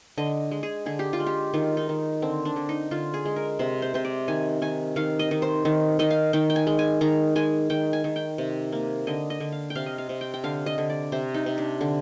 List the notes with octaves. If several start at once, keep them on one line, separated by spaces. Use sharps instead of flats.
D3 D#5
G#3
G#4
D3 G#4
G4
F4
G#3
G4
D#3 F4
D#4
D#3
D3 C4
D4
D3
D#4
D3 F4
G#4
G#3
A#4
C3 C5
C5
C3 C5
D5
D#3 G#5
D#3 G#5
D#3 F5
D#5
D#3
C5
D#3
D#3 D#5
F5
D#3 G5
G5
G#5
G#3
G#5
D#3 A#5
G#3 G#5
D#3 G5
G#5
D#3
G5
C3
A#3
D3 D#5
D#5
D3
F5
G5
C3 F5
D#5
F5
C3
G5
G5
D3 F5
D#5
D3
D5
C3 C5
D#4
C3
D4
D3